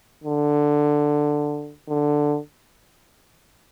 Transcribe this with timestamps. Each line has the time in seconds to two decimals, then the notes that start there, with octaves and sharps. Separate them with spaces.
0.24 D3
1.89 D3